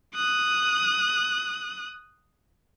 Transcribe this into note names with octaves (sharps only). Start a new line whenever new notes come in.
D#6 F#6